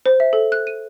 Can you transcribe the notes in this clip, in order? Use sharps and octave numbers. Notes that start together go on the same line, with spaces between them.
C5
E5
A4
F#6
D#7